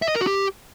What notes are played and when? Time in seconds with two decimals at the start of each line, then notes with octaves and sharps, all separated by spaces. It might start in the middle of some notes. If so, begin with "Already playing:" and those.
0.02 E5
0.08 D#5
0.15 A#4
0.21 F#4
0.27 G4